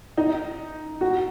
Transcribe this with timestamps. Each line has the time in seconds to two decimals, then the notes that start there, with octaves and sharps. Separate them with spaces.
0.18 D#4
1.01 F#4